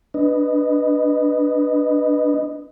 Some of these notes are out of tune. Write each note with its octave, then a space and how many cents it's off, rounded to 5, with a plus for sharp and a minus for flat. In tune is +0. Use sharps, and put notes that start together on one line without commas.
D4 +0 B4 +0 D#5 +0